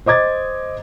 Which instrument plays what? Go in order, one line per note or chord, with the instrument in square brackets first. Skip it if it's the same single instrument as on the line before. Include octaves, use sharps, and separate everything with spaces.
[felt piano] C5 D#5 D6 G#6 A6